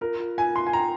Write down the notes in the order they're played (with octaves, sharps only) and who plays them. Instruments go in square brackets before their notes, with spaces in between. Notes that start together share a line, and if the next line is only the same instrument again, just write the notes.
[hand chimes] F4 [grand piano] A#4
[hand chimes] F4
[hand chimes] F4 [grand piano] G#5
[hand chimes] F4 [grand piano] C6
[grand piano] G#5
[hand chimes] G5 [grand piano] A#5